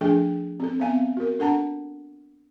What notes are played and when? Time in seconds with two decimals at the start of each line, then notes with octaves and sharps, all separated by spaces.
0.01 F3 A3 D4 G#4 A4 G5
0.60 C4 A4
0.80 B3 C4 E5 F5 G#5
1.17 F#4 A#4
1.39 D4 A4 F#5 A5 A#5